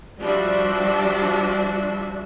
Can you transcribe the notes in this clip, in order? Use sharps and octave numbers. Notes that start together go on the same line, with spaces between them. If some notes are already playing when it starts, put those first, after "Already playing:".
F3 G3 D4 F#4 E5